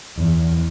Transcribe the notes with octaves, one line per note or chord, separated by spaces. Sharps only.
E2